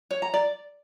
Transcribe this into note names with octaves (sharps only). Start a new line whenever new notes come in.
C#5
A#5
D5